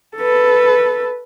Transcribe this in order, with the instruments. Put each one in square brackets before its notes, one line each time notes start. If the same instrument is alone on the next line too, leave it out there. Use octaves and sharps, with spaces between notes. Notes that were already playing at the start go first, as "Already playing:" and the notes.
[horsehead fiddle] A4 B4